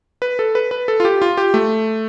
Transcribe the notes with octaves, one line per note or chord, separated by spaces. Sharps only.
B4
A4
B4
B4
A4
F4
G4
F4
G4
A3